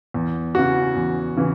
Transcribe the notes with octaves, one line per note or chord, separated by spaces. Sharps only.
E2
C#3 E3 F#4
E2
C#3 E3